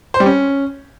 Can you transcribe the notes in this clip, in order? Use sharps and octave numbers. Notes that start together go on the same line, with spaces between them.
C5
G3
C#4